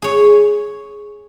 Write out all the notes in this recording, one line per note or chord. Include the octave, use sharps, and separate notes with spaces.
G#4 C#5